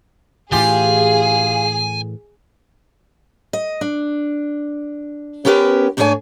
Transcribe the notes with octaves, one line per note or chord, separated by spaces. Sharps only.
A2 E3 F4 G4 G#4 G#5
D#5
D4
B3 C#4 G4 A#4 B4
G#2 A3 D4 D#4 C#5 G#5